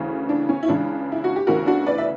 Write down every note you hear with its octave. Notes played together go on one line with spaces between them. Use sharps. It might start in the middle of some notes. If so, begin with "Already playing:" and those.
Already playing: D2 C#3 E3
D4
C#4
E4
C#2 C#3 E3 D4
E4
F#4
G4
D2 C#3 E3 F#4 A#4
D4 F#4
B4 D5
E5